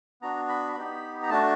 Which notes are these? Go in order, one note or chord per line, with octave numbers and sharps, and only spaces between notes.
B3 D4 F#4 A#5
B5
B3 D#4 G4 B5
A#5
A3 D4 F#4 A5